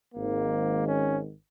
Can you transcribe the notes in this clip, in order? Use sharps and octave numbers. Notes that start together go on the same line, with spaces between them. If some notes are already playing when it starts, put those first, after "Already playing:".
G#1 G#2 D#3 A#3
C#4